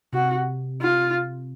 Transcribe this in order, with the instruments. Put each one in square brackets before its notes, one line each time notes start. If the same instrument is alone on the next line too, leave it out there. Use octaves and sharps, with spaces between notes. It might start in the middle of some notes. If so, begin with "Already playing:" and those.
[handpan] C3 [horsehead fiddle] F#4
[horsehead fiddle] F4